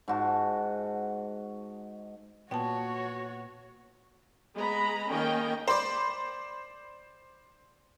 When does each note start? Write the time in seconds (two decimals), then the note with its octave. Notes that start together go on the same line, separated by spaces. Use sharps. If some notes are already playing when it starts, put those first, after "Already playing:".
0.08 G#2 F#4 A5
2.51 A#2 B3 F#4 C#5 G5 A5
4.55 G#3 B3 A#5 B5
5.10 D#3 A#3 C#4 A#4 D#5 G5
5.68 C5 D5 B5 D6